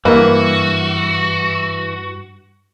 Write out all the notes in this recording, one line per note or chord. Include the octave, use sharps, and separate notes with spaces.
G2 E3 A#3 F#4 B4